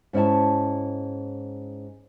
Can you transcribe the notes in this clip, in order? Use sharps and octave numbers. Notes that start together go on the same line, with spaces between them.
G#2 C#4 E4 A5